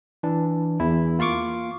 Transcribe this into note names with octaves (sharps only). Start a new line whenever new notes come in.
E3 D4
E2 E4
A#3 F4 F5 C#6 D6